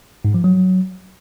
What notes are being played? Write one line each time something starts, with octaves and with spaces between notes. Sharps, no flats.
G#2
F3
F#3